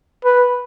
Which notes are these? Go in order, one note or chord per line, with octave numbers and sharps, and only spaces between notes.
B4